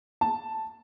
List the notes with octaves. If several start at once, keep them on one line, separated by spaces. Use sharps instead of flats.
A5